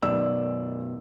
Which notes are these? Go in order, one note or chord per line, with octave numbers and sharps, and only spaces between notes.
F#2 B2 D#3 D5 E6